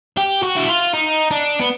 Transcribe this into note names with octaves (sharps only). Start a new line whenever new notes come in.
G4
F#4
E4
F4
D#4
D4
B3